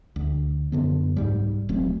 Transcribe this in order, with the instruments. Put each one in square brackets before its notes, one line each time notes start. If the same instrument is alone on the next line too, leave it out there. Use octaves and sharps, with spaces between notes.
[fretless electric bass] D2
F#2 D3 B3
C2 G#2 G3
D#1 F#3 A3 C4